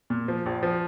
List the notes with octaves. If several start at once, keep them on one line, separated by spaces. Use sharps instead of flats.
A#2
F3
A#1
F3